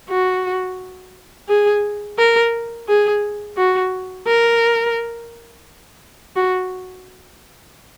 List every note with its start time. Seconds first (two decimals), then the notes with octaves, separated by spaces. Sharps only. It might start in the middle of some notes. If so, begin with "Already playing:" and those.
0.09 F#4
1.49 G#4
2.19 A#4
2.88 G#4
3.57 F#4
4.27 A#4
6.36 F#4